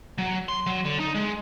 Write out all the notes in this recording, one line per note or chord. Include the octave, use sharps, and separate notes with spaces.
F#3
C6
F#3
D3
D#4
G#3